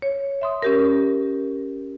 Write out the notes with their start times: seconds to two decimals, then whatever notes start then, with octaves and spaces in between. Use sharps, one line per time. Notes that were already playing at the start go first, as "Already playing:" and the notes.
0.02 C#5
0.41 E5 C6 D#6
0.62 C#4 G4 A#4